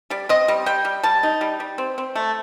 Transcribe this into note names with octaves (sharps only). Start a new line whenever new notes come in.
G3 D5
C4 D#5
G3
G3 G5
G3
G3 A5
D#4
G3
G3
C4
C4
A3